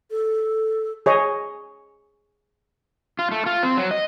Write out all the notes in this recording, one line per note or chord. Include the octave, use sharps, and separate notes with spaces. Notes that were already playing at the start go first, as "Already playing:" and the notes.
A4
G#4 C#5 D#5
F4
A3
F4
C4
F#3
D#5